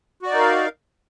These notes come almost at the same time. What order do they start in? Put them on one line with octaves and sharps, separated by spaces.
F#4 D5 D#4 A#4 F5